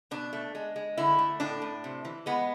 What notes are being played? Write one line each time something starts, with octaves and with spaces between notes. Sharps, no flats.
B2 D4
A3
G#3
G#3
D3 E4
A3
A2 D4
A2
C3
E3
G#3 B3